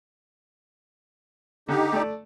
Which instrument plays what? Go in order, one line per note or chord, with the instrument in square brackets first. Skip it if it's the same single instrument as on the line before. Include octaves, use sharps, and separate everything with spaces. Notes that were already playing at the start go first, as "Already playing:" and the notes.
[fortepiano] D3 [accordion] D#4 G4
[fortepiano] A3 D5